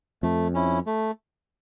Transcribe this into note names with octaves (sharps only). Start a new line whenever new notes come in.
F2 A3
C#4 E4
A3